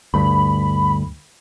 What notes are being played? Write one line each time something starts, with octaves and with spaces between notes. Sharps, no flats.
D2 G2 B5